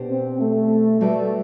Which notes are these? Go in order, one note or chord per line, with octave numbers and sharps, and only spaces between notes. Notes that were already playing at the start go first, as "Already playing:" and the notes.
Already playing: B2 D4 G4 C5
C4
A3
G3 A3 D4 F#4 B4 D5